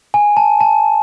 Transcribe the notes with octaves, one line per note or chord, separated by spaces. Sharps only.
G#5
A5
A5